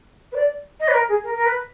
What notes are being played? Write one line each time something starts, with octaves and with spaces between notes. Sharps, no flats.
B4
D5
D#5
B4
A#4
G#4
A#4
A#4
B4